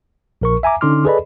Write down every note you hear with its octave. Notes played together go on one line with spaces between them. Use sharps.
A#1 A#4 C#6
E5 G#5 A#5 D6
D3 C#4 D#4 C6 D6 F6
G#4 A4 B4 D5 D#5 B5